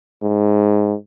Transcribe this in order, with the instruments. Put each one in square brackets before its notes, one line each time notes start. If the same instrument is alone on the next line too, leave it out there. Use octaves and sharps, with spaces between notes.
[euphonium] G#2